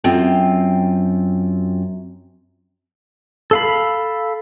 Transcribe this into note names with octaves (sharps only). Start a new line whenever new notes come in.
F#2 C4 F4 G5
A4 F5 B5